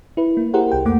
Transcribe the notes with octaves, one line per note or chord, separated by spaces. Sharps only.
E4 B4
A#3
E4 G4 G#4 A#4 C5 F#5
C2 G5
F2 A3 A#3 F#5 D6